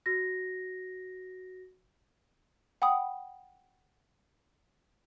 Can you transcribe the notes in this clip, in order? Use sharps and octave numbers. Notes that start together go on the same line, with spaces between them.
F#4 A#6
F#5 G5 B5 D#6